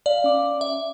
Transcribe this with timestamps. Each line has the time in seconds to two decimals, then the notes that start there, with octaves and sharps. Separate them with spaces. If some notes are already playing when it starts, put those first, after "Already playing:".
0.06 D5 F5
0.24 C#4 D6
0.61 E5